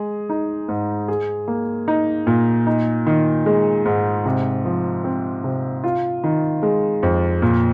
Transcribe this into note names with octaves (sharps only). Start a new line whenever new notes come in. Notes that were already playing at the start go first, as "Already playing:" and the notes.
Already playing: G#3 G#4
D#4
G#2
G#4
A#3
D#4
A#2
D#4
D#3
G#3
G#2
C3
F3
C4
C3
F4
D#3
G#3
F2
A#2